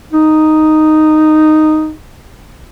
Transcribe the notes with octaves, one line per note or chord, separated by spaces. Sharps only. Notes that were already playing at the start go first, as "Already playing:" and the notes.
D#4